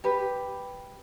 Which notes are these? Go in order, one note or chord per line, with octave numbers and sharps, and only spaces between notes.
G4 B4